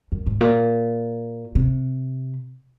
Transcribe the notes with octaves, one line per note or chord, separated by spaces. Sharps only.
F#2
G#2
A#2
C3